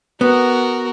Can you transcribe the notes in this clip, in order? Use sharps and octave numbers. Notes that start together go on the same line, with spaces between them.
B3 F#4 A#4